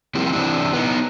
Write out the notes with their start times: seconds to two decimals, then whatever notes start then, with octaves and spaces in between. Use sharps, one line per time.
0.15 C3 F3 G3 A#3 C4 E4
0.33 C3 E3 G3 D4 E4
0.73 B3 D#4